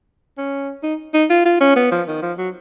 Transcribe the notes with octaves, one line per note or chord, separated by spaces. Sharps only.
C#4
D#4
D#4
F4
F4
C#4
B3
F3
D#3
F3
F#3